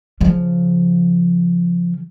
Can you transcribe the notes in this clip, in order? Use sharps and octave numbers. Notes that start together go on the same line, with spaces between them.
C#3 F3